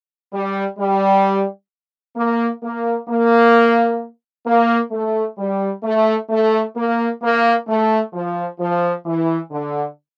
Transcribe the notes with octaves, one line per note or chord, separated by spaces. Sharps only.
G3
G3
A#3
A#3
A#3
A#3
A3
G3
A3
A3
A#3
A#3
A3
F3
F3
E3
D3